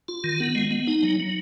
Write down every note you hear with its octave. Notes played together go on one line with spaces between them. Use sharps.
F4
D#3
B3
G#3
B3
D#4
F#3
F#3